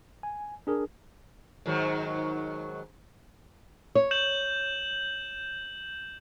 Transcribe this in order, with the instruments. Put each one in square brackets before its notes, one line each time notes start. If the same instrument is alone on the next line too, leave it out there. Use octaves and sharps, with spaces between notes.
[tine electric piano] G#5
D4 G#4 A#4
[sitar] G#2 D#3 F#3
[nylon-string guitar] C#5
[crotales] G6 E7 F#7